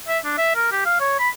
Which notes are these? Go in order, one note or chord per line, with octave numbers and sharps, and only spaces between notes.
E5
D4
E5
A#4
G4
F5
C#5
B5